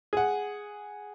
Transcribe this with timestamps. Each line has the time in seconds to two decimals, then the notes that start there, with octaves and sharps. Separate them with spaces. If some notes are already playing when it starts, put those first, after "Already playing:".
0.13 G#4 F#5